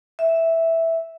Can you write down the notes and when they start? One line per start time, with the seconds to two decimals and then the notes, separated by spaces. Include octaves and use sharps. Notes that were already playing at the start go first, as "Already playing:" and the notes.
0.19 E5